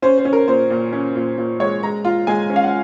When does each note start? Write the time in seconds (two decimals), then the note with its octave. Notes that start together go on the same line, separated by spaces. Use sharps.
0.02 C#4 C5
0.18 C5
0.25 C#4
0.33 A#4
0.48 A#2 C5
0.70 A#2
0.93 C#4
1.16 A#2
1.38 A#2
1.60 G#3 C#5
1.83 G#3 A#5
2.05 F4
2.27 G#3 G#5
2.50 C#4
2.56 F5
2.64 F#5